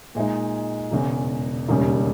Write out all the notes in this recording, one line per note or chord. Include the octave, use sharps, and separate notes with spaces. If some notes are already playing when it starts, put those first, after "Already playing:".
A#2 G#3 D#4
E1 E2 C#3
E1 D#2 C#3 G3 C#4